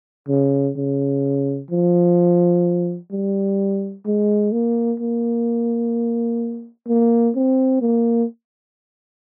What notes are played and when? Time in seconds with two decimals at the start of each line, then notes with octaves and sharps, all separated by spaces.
0.29 C#3
0.76 C#3
1.71 F3
3.12 G3
4.06 G#3
4.52 A#3
5.00 A#3
6.88 A#3
7.36 C4
7.82 A#3